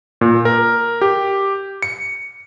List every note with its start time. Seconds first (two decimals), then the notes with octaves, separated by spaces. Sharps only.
0.21 A#2
0.45 A#4
1.01 G4
1.82 C#7